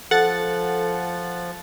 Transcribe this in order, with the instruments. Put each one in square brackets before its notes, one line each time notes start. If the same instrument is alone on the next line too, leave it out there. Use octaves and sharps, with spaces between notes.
[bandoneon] F3 [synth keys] A4 [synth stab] F#5 A6